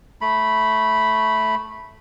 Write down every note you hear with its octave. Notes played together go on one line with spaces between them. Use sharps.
A3 B5